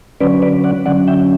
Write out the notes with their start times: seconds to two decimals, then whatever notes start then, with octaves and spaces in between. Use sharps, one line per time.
0.20 D3 F#3 C#4 B4 D5
0.42 B4 D5
0.64 D5 F#5
0.86 D3 F#3 C#4 D5 F#5
1.08 E5 G5